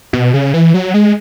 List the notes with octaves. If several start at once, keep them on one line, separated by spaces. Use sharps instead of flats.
B2
C#3
E3
F#3
G#3